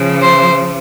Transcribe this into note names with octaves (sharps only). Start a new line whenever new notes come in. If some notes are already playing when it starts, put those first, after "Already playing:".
Already playing: C#3 F3
C5